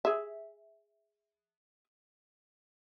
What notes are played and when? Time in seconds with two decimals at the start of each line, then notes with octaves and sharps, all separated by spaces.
0.05 G#4 E5